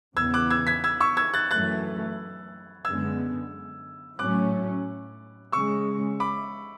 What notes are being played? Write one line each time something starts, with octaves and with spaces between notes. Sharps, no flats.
E2 C#3 E3 B3 E6 G#6
D6 F#6
E6 G#6
G#6 B6
E6 G#6
C#6 E6
E6 G#6
F#6 A6
F#2 E3 A3 F#6 A6
F#2 D3 G#3 B3 E6 G#6
A2 F#3 A3 C#4 D6 F#6
C#3 G#3 C#4 C#6 E6
B5 D6